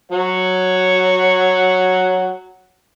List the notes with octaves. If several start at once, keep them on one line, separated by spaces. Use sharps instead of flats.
F#3 C#5 F#5